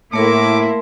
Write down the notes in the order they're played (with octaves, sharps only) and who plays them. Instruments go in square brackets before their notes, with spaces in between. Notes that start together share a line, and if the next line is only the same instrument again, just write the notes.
[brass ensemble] A2 [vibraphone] A3 A#4 C6 [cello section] A#3 E4 [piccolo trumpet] D6